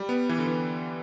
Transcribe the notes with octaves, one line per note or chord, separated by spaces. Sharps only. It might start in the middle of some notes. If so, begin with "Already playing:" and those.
Already playing: G3
B3
E3
D3
E3